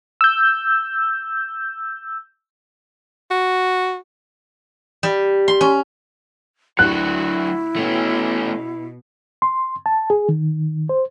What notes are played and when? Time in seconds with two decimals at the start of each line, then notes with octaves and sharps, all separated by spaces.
0.21 E6 G6
3.31 F#4
5.03 G3
5.48 C6
5.61 C#4
6.79 D2 F#3 D4 E4 F#4 F#6
7.76 B2 A3 C#4
9.42 C6
9.86 A5
10.10 G#4
10.29 D#3
10.89 C5